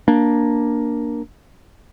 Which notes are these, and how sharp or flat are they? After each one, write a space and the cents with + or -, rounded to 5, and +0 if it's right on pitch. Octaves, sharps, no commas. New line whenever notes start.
A#3 +10 D4 +0